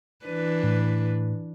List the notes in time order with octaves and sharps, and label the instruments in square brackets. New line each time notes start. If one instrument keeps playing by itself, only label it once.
[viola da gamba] E3 D4 B4
[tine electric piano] A2